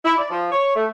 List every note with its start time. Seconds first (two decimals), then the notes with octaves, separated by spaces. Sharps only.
0.04 E4
0.18 D5
0.30 F3
0.52 C#5
0.75 A3